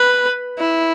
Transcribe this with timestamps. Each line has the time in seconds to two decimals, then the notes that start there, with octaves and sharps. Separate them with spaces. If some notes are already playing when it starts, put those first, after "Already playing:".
Already playing: B4
0.59 E4